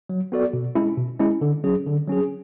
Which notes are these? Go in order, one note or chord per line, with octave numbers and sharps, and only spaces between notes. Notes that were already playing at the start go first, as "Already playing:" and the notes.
F#3
B3 F#4 A4 D5
B2
G#3 C#4 E4
B2
G#3 C#4 E4
D3
F#3 C#4 G#4
D3
F#3 C#4 G#4